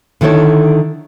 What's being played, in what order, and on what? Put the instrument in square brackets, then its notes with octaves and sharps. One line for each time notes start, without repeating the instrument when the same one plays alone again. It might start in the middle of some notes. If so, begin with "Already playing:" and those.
[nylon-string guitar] D3 D#3 E4 A4 C#5